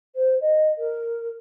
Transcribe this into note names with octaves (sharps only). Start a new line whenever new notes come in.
C5
D#5
A#4